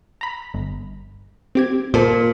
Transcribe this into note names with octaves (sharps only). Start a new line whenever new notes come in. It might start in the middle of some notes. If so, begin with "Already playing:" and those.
A#5 B5
G1
C4 G4 G#6
A#2 A4 C5